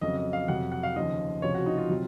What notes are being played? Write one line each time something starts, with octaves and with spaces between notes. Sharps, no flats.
F2 C#3 F#3 D#5
D#5
F5
F2 C3 F#3 F#5
F#5
F5
D#2 C#3 F3 D#5
C#2 C3 F3 C#5
F#4
D#4
F4
C3 F#3